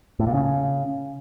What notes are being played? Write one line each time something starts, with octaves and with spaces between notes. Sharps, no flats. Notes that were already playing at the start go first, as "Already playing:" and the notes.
A2
A#2
C#3